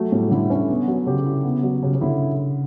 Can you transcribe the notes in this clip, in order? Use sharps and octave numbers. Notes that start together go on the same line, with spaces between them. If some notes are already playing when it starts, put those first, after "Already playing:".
Already playing: F#3 A3
A2 G3
D3 E4
C#4
B3
F#3
C#3 G4
E4
B3
F#3
C#3 G4
C#3
D3 E4